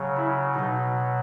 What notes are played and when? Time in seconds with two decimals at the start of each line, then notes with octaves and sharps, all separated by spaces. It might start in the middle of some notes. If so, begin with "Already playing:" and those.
Already playing: C#3 F#3
0.16 E4
0.54 B2 F#3 D#4